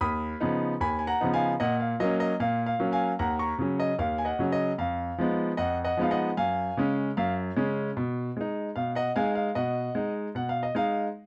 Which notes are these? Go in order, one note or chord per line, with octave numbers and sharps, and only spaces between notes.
D#2 B5 D#6
C#3 F3 B3 D#4
D#2 G#5 B5
G#5
F#5 A#5
C#3 F3 B3 D#4
F5 G#5
A#2 D#5 F#5
F5
F#3 A#3 C#4 D#5
D#5
A#2 F5
F5
F#3 A#3 C#4
F5 G#5
D#2 F#5 A#5
A#5 C#6
C#3 F#3 C#4
D#5
D#2 F5
G#5
D#5 F#5
C#3 F#3 C#4
D#5
F2 F5
F3 G#3 B3 D#4
F2 D#5 F#5
D#5 F#5
F3 G#3 B3 D#4 F5
D#5 F#5
F#2 F5 G#5
C#3 G#3 C#4
F#2 F5
C#3 G#3 C#4
B2
G#3 D#4
B2 F5
D#5 F#5
G#3 D#4 F5 G#5
F5
B2 D#5 F#5
G#3 D#4
B2 F#5
F5
D#5
G#3 D#4 F5